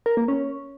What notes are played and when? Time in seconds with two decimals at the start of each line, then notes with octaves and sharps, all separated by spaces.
0.06 A#4
0.17 A#3
0.28 C#4